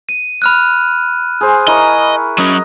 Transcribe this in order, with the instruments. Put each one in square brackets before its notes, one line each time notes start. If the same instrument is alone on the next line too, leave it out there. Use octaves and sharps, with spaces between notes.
[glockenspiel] D#7
B5 F6 F#6
[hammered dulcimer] G#4 C5
[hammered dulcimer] E4 A#4 C#6 [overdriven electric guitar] D#5
[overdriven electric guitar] F#3 C#4 [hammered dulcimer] D#5